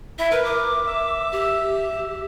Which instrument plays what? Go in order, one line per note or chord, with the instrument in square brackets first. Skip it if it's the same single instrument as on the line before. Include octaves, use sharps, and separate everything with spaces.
[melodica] E4 [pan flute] E5
[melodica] A#4 [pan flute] B4
[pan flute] D6
[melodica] E5
[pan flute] G4